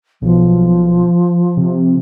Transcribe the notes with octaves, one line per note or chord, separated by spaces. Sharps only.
B1 F3
C3